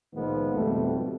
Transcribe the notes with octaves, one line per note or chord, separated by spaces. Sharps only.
C#2 A#2 D#3 F3 G#3 B3
G#1 F2 B2 G3 A3 A4